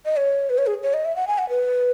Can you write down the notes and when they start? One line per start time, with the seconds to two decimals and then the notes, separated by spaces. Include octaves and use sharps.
0.06 D#5
0.17 C#5
0.50 B4
0.58 C#5
0.67 G#4
0.83 C#5
0.94 D#5
1.05 E5
1.16 F#5
1.27 G#5
1.38 F#5
1.49 B4